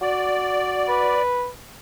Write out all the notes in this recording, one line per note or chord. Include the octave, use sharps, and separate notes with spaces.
F#4 D5
B4